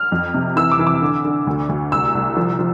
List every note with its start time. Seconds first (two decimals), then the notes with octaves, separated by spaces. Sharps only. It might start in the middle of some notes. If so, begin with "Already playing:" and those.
Already playing: F6
0.12 F2
0.34 C3
0.56 E3 E6
0.72 D6
0.79 E3
0.87 D6
1.01 D3
1.25 D3
1.47 D2
1.69 D2
1.92 C2 E6
2.14 C2
2.37 F3
2.59 F3